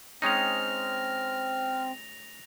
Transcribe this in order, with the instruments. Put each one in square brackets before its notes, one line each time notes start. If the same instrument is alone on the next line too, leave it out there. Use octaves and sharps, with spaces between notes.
[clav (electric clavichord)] G#3 C#4 D#4 [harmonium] C4 [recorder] F6 [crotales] A#6 F7